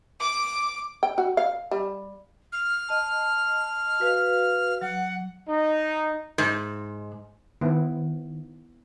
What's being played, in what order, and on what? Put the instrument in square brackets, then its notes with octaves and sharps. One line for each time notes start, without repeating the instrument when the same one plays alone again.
[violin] D6
[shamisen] G5
F#4
F5
G3
[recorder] F6
[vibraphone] D#5 A5
F#4 B4 F5
[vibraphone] F#3 [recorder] F#5
[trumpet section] D#4
[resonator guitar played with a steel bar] G#2
[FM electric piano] D#3 [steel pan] B3 C4 E4